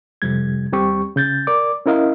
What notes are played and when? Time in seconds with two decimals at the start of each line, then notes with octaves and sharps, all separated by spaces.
0.22 F2 C3 G3 G#6
0.72 D#2 G3 C4 G4 C#6
1.16 C#3 G6 A6
1.47 A#4 D5 D6
1.86 C#4 E4 A#4 D#5 F5